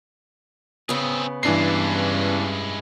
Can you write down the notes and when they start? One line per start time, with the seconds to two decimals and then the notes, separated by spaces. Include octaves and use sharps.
0.89 C#3 B3 C4 G#4
1.43 G2 E3 G#3 C#4 D4 E4 C7